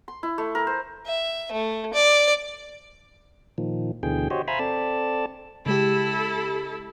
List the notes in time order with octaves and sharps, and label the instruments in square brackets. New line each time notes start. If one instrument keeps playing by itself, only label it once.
[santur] C6
E4
A3
A#4
C5
[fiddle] E5
A3
D5
[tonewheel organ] A#2 D#3 F3
D2 B2 D3 E3 G#4 G5
F#4 G4 C5 C#5 D#5
C5 E5 F5 G#5 A#5 B5
C4 A4 D5 A5
[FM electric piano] C#3 G#3 G4 [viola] E4 A4